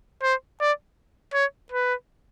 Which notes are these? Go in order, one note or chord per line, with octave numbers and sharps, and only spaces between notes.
C5
D5
C#5
B4